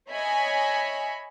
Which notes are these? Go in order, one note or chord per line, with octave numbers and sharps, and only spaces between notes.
C#5 D#5 E5 G#5 B5